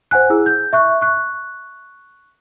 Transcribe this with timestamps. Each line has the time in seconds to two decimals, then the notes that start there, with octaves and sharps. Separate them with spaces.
0.11 C5 F#5 G#5 F#6
0.30 E4 G#4 E6
0.46 G6
0.73 E5 C#6 F#6
1.01 C#6 F#6